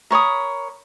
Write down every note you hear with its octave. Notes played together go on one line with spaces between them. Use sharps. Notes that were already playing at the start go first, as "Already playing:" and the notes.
A#4 C#5 B5 D#6